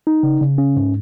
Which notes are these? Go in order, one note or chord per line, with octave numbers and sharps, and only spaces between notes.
D#4
C#3
C#3
C#4
G#2